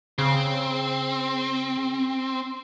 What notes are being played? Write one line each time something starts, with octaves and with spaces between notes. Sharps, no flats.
C#3 C4